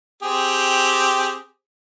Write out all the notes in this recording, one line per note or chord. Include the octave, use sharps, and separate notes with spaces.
C4 G4 G#4